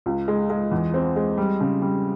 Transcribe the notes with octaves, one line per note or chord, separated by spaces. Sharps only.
C#2
G#3
G#3
E2
C4
G#3
G3
C#3
G3